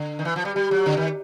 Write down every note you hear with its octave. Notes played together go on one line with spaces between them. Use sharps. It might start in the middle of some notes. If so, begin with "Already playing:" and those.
Already playing: D3
D#3
E3
F3
G3
G3
F#3
D3
D#3